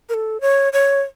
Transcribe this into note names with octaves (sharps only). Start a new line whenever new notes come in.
A#4
A4
C#5
C#5